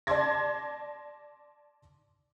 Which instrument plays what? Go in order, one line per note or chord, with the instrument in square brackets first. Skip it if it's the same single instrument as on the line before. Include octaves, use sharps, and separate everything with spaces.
[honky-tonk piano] D5 A5 C6 D6 G#6 A#6